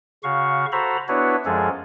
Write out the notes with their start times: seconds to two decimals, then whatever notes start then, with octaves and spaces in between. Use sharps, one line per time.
0.24 C#3 F#4 F5 C#6
0.72 F#4 A4 C5 A#5 B5
1.08 B3 D4 E4 F#4 B4 C#5
1.45 F#2 F3 G#3 G#4 A4